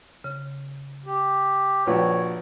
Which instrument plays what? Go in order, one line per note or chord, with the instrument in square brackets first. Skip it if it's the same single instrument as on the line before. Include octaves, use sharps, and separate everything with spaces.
[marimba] C#3
[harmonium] G4
[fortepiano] A#1 F#4 G5 [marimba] B4 [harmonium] C#5